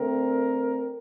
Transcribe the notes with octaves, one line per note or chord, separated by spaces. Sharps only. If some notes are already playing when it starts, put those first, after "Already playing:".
Already playing: D3 A3 C4 A#4